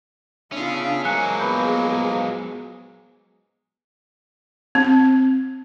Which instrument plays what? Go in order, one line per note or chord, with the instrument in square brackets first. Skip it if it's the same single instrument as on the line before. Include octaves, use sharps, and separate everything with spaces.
[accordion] B3 E5 [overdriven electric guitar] C#4 G#4 [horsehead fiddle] D4 F4
[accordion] F3 A#3 [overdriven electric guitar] F#3 G#3 [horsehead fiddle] E5 [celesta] G#5 F#6 C#7
[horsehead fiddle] B3 G#4 [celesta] B4 B5 G6
[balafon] C4